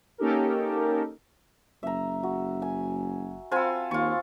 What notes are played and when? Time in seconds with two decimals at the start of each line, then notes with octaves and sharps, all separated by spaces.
0.18 A#3 C#4 D#4 G4 A4 A#4
1.83 F#1 E5 A#5
2.23 F#4
2.62 G#5
3.51 C4 F4 A4 G#5 B5
3.91 D#2 F4 C#6